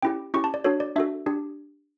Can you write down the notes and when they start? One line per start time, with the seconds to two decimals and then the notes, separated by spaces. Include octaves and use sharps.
0.02 C#4 E4 G4 G5
0.34 C#4 E4 G4 C#6
0.44 A5
0.54 D5
0.64 D4 F#4 A4 C#5
0.80 D5
0.96 D4 F#4 A4 E5
1.26 D4 G4